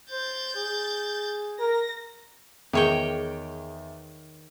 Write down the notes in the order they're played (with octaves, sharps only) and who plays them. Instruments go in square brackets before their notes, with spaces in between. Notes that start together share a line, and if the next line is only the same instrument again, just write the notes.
[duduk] C5 [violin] G6 A6
[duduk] G#4
[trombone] A#4 [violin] A#6
[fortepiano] E2 [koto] D#3 C#5 G5 [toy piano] G#4 D6